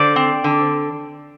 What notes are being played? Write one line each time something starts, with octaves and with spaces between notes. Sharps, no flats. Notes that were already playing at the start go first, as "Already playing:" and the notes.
Already playing: D3 C5 D5
C4
D3